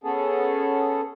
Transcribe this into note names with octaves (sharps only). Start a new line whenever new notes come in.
B3 C#4 G#4 A4